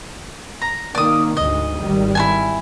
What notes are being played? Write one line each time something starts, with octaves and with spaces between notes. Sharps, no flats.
A#5
D#3 A#3 D5 D#6
D2 G#2 D#5
G#1 D#3 G3
E4 A4 G#5